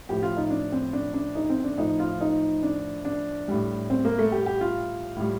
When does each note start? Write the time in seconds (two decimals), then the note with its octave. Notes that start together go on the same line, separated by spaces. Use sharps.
0.09 A2 F3 G4
0.23 F4
0.37 D#4
0.51 D4
0.72 C4
0.93 D4
1.14 D4
1.35 D#4
1.50 C4
1.64 D4
1.78 A2 F3 D#4
2.00 F4
2.21 D#4
2.63 D4
3.05 D4
3.48 A2 G3
3.90 C4
4.05 A#3
4.19 A3
4.32 G4
4.46 G4
4.61 F4
5.17 A2 G3